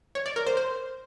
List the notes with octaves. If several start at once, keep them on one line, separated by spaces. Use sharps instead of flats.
C#5
D5
A#4
C5
C5